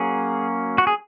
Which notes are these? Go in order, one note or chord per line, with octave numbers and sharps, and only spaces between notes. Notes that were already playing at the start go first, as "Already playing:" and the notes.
Already playing: F#3 A#3 C#4 G#4
F#4
G#4